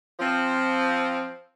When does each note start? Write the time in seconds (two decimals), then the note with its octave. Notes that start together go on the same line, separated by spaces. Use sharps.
0.20 F3 C4